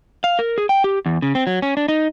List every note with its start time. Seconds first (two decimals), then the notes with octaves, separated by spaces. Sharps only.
0.24 F5
0.39 A#4
0.58 G#4
0.69 G5
0.84 G4
1.06 E2
1.22 C#3
1.35 C4
1.47 F#3
1.62 C#4
1.77 D4
1.88 D#4